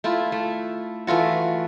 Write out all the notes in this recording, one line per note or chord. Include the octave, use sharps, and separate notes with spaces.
A3 E4 F4
A3
E3 A3 F4 F#4